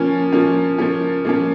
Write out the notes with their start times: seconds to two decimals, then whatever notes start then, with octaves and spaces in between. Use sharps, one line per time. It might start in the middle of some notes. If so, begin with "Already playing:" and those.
Already playing: F3 A#3 C#4
0.33 F3 A#3 C#4
0.78 F3 A#3 C#4
1.25 F3 A#3 C#4